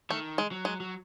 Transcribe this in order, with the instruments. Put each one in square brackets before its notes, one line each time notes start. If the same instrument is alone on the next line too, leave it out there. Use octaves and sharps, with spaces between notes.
[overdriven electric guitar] D#3 [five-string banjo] A3
[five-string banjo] G#3
[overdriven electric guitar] F#3
[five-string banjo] G#3
[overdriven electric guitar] F#3